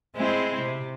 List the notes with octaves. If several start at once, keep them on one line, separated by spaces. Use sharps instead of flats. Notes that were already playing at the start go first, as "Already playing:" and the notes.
G#3 C4 E4
C3